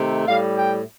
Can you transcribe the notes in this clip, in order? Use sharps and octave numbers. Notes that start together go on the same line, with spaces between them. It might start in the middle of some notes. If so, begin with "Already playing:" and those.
Already playing: C3 D#3 A3
A2 G3 F5
G5